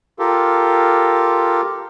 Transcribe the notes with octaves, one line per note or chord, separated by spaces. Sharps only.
F4 G4 A4 A#4